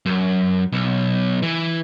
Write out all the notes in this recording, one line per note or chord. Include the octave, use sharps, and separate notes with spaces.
F#2
B1
E3